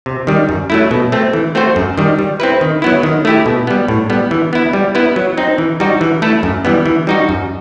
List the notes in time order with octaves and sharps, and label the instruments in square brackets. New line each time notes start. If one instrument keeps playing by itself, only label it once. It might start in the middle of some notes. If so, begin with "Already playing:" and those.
[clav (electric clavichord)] C3
D#3 G3
F#2
F#3 A3 E4
B2
A3 C4
E3
A3 C4 F#4 C5
F#2
D#3 G3
G3
C4 E4 B4
D#3
F#3 B3 E4
D#3
A3 E4 G4
B2
G3 B3
A2
G3 B3
E3
B3 E4
G3
B3 E4 B4
F#3
C4 D#4
E3
G3 D#4 F#4
E3
A3 E4 A4
F#2
E3 G3 B3
E3
G3 D#4 F#4
F#2